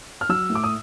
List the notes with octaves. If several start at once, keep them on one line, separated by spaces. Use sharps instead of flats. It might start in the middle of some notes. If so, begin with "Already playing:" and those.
F6
F#3 E6
A2
D6
D#6